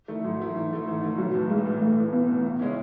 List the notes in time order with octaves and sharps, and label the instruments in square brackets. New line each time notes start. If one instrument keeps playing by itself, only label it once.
[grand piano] D#3 A3 E4
[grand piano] G#2 [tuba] F#3
[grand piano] D#3 A3 E4
[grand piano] G#2 [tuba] E3
[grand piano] D#3 A3 E4
[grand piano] G#2 [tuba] E3
[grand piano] D#3 A3 E4
[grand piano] B1 [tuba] F#3
[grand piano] A2 E3
[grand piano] B1 [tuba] G#3
[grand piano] A2 E3
[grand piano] B1 [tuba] A3
[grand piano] A2 E3
[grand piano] B1 [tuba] B3
[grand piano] A2 E3
C#2
C#3 G#3 C#4 E4